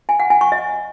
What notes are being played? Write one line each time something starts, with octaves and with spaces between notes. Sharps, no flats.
G#5
F#5
G#5
C#6
D#5